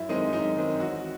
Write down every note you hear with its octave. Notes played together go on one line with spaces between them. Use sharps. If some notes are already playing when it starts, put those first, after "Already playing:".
Already playing: F#2 E4
D#3 G#3 C4 D#4
F#2 D#4
D#3 G#3 C4
A1 F#4